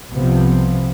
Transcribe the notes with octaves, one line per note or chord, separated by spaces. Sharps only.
C2 C3 F3 B3